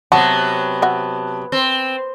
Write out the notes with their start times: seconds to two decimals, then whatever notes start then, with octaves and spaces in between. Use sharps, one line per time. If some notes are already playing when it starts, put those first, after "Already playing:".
0.12 C3 F#3 B3 F#4 A5
0.82 F#4 E5
1.52 C4